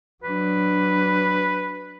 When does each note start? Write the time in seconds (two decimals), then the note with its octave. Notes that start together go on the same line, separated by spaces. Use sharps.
0.23 F#3 D4 B4